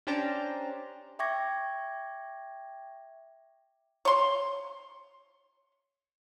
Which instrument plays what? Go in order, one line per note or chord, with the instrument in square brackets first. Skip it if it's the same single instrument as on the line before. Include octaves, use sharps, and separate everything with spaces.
[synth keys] C#4 D4 G4 C5 A5 A#5
[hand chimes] E5 G5 C#6 D6 G#6 A#6
[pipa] C#5 C6